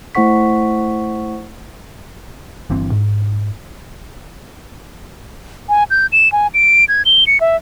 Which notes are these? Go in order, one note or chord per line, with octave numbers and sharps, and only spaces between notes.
A3 E4 C5 F#5 C#6 B6
G1 G2 E3 C4
G#2
G#5
G6
E7
G#5
D7
G#6
G7
C#7
E5